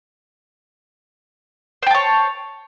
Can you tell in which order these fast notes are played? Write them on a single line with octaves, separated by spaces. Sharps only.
C5 G5 A5 C#5